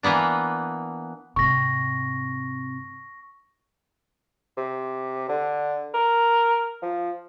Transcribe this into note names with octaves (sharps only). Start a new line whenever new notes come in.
E3 A#3 B3 D4
G#2 C3 C#6 A#6
C3
D3
A#4
F3